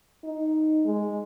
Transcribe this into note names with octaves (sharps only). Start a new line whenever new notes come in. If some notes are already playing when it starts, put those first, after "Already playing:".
D#4
G#3